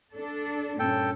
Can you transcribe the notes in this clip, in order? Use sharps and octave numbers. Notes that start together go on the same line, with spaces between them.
D4 A4
G2 A#2 C#4 A4 G5